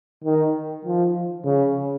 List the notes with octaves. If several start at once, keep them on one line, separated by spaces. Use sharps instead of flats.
D#3
F3
C#3